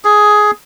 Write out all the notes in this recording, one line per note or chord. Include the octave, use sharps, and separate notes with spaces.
G#4